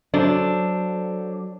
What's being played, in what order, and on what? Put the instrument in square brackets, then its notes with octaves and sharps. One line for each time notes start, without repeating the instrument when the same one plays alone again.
[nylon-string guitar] F#3 [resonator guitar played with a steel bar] D4 [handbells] A4 C5